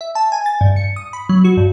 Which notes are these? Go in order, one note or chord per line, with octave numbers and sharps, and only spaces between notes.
E5
A5
G#5
A6
G2
C#7
D#6
B5
F#3
F#4
G2